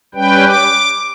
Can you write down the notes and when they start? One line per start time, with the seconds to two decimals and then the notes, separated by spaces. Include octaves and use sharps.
0.15 G3 C#4 B4 G5
0.47 D6